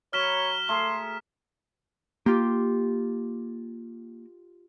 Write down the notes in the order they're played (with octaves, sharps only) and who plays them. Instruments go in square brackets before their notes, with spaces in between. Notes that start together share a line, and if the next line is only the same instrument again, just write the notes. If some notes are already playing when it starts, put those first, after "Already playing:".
[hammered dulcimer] F#3 B4 [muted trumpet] C#5 [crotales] F6 B6 E7 [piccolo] G7
[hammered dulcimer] A3 G#4 A#5 [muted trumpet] C6
[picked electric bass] A#3 [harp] F4 G4